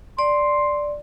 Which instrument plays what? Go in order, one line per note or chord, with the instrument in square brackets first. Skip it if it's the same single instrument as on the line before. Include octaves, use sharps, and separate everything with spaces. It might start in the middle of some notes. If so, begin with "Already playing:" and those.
[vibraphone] D5 [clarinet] C6